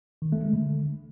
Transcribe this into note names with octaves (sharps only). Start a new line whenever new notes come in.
D#3
A3
G#3
D3